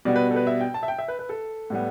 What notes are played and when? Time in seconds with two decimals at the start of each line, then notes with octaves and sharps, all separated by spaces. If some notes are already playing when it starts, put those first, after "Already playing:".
0.05 B2 G3 B3 D5
0.16 B4
0.31 A4
0.36 B4
0.47 E5
0.61 G5
0.74 A5
0.83 E5
0.88 G5
0.98 E5
1.08 B4
1.19 B4
1.29 A4
1.70 A2 G3 B3